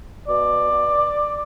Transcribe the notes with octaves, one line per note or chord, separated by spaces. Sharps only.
B2 D5
B2